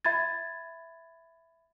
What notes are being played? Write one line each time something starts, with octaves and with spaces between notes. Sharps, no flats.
E5 B5 G#6 A6